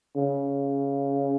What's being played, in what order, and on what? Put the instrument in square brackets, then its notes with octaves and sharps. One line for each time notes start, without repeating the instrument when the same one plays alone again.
[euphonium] C#3